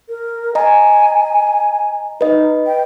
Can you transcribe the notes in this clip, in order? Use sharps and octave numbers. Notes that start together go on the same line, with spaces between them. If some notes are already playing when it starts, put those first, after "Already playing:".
A#4
D#5 G#5 A#5
D#4 B4 D#5
G5